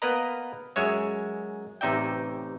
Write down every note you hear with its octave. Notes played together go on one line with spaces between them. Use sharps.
A#3 B3 A#4 B4 D#5 A#5
F#2 G#3 C#5 E5
A1 C3 D#4 D5 E5 G5